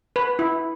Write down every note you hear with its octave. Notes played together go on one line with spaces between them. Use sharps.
B4
E4